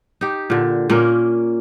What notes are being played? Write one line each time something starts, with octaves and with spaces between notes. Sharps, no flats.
D#4 G4
A#2 D3
A#2 A#3 C#4 A#4